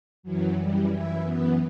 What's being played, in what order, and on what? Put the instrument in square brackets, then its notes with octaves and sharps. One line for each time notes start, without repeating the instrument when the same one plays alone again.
[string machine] F#2 E3 F#3
G3
E4
B3